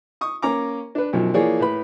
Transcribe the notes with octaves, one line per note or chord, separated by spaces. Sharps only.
C#6 D#6
A#3 C#4 A#5 D6
D4 B4
B1 F#2 B2 F3
E3 F3 A#3 G#4 C#5 D5
A2 B4 B5